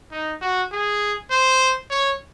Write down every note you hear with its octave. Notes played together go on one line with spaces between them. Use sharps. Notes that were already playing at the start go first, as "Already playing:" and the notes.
D#4
F#4
G#4
C5
C#5